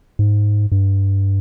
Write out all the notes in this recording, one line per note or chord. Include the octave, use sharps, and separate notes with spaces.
G#2
G2